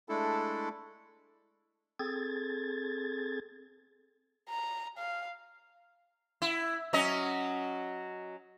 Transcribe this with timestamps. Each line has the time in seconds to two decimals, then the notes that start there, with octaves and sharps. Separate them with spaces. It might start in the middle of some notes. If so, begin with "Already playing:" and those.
0.09 G#3 A3 D4 E4 A4
1.99 C4 G#4 A4 G#6 A6
4.50 A#5
4.98 F5
6.42 E4
6.93 F#3 C#4 D#5